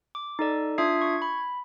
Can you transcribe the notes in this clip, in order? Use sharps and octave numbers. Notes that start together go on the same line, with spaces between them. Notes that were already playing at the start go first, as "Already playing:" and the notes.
D6
D#4 A4 D5
D4 F4 E5 D#6 G#6 C7
C#6 G#6
B5